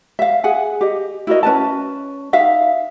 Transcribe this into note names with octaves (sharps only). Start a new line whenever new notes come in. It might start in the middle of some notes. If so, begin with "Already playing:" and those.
E5 F5
G#4 F#5 G#5
G4 D#5
E4 F#4 A#4 D#5
C#4 B4 A5
D#4 E5 F5